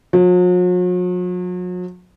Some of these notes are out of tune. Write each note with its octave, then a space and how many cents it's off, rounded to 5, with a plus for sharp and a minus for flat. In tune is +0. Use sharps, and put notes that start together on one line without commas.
F#3 -45